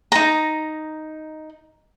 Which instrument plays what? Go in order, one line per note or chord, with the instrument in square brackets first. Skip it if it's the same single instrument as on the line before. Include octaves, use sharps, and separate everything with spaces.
[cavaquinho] D#4 A#5